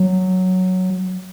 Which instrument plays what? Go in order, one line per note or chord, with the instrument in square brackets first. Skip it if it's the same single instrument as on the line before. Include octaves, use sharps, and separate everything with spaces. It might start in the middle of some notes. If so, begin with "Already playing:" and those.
Already playing: [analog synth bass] F#3